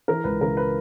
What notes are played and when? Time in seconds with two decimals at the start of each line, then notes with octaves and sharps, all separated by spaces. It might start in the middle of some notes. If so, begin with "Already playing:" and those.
0.08 E3 A#4
0.24 C#2 B4
0.41 C#3 A#4
0.57 B4